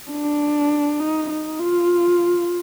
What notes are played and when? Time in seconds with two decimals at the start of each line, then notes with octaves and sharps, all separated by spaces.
0.10 D4
1.00 D#4
1.29 D#4
1.59 F4